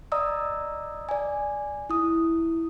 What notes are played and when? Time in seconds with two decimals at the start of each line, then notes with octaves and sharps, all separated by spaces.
0.12 D5 D#5 A#5 D#6 E6
1.09 D5 G#5
1.90 E4 D#6